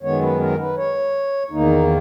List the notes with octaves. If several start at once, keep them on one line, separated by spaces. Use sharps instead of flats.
F#2 D#3 G#3 B3 C#5
B4
A#4
B4
C#5
E2 D#3 A#3 D#4